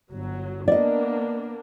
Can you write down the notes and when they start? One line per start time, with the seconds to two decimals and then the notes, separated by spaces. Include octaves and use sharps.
0.11 G1 F#3
0.68 A#3 B3 D4 D5 D#5